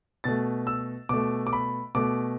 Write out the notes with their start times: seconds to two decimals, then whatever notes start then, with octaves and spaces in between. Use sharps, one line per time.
0.24 B2 A3 A6
0.67 E6
1.09 B2 A3 D6
1.47 D6
1.53 B5
1.95 B2 A3 D6